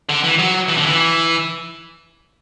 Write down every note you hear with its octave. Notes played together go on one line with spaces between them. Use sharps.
D3
E3
F#3
E3
D3
E3